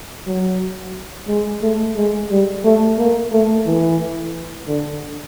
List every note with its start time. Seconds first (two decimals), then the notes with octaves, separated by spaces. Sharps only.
0.27 F#3
1.28 G#3
1.62 A3
1.96 G#3
2.30 G3
2.64 A3
2.98 A#3
3.32 A3
3.66 E3
4.68 D3